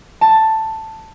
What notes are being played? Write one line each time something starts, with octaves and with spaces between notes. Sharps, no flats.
A5